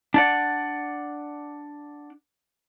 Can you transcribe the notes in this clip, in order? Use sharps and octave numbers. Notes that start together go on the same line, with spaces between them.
D4 D5 F#5